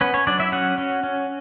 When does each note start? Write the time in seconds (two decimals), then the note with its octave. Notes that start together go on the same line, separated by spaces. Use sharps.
0.01 B3 C#4 B4
0.14 C#4 C#5
0.27 F#3 D4 D5
0.40 E4 E5
0.52 C#4 F#4 F#5
0.78 C#4
1.04 C#4